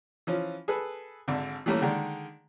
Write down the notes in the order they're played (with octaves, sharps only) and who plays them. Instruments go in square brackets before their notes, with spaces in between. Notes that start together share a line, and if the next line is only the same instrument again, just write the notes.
[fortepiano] E3 F3 C#4
G#4 A4 B4
G#1 D3
E3 G3 A3 A#3 C#4
D3 D#3 G#3